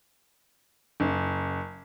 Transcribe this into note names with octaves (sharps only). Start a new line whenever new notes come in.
F#1